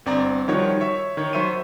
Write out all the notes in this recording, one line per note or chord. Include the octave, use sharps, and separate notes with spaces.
G1 C4 D5 A#5
D#3 F3 G3 D#4 F#4 C#5
C#5 E5
D#3 C#5
F#3 C5 E5 C#6 D#7